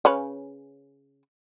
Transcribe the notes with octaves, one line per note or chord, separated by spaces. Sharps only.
C#3 C#4 B4